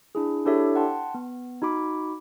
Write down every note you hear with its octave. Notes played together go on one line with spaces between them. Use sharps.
D4 E4 G#4
D4 E4 G4 A4 C#5 E5
F#5 G5 A5 C6
B3
D#4 F#4 B5 D6